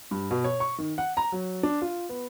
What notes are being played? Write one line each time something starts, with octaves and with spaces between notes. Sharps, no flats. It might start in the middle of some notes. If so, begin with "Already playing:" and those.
G2
B2
C#5
C#6
D#3
F#5
A#5
F#3
D4
F4
B3